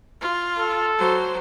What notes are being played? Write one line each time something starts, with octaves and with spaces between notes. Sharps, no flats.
F4
A4
F#3 C5